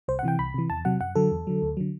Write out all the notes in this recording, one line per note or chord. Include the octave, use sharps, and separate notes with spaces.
C2 C5
F#5
C3 E3 G5
C2 B5
C3 E3
E2 A5
C3 F#3 F#5
F#2 F#5
D3 F#3 A4
E2
D3 F#3
D2
D3 F#3